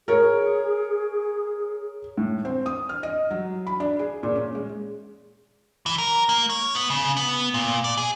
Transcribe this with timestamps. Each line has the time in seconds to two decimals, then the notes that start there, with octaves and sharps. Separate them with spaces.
0.08 G#4 A#4 C#5
2.18 A2
2.45 C4
2.66 D#6
2.89 F6
3.03 D#5
3.30 F#3
3.67 B5
3.80 D4
3.99 G#4
4.23 A#2
4.36 C#4
4.55 G#3
5.86 E3
5.98 A#4
6.29 A#3
6.50 C#5
6.75 B3
6.90 C#3
7.17 B3
7.54 A#2
7.84 D5
7.97 G#4